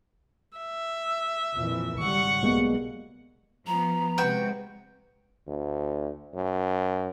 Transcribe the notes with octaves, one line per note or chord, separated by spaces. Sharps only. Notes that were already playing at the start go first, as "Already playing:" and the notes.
E5
F2 A#2 E3
G#1 C#3 G3 F#5 C#6
B1 B2 G3 G#3 A#3
F3 B3 A#5
C3 G#3 F#4 B4 G5
D2
F#2